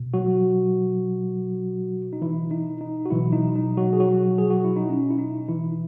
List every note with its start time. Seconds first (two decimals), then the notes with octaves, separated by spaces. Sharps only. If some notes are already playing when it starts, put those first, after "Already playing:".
Already playing: B2
0.14 F#3 F#4
2.13 D#4
2.22 E3 E4
2.51 D#4
2.81 D#4
3.06 F#4
3.11 B2 E3 F#3 E4
3.33 D#4
3.56 D#4
3.77 F#3 F#4
3.93 G#4
4.00 F#3 F#4
4.38 G#4
4.51 F#4
4.64 E4
4.76 D#4
4.89 C#4
5.11 E4
5.19 D#4
5.48 E3 E4